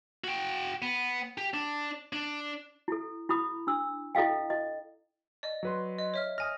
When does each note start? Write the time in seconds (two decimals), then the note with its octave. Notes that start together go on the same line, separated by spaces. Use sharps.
0.24 F#4 G5
0.82 B3
1.38 G4
1.54 D4
2.13 D4
2.88 E4 A4
3.29 E4 B5 D#6
3.67 D4 E6
4.15 E4 A4 D#5 F5 G5
4.50 D#5
5.43 D5 D#5
5.63 F#3 B4 C6
5.98 D#5
6.14 C#5 E5 F6
6.38 G#5 D#6 F6 A#6